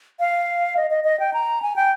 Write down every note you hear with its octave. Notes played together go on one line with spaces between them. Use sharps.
F5
D#5
D#5
D#5
G5
A#5
G#5
G5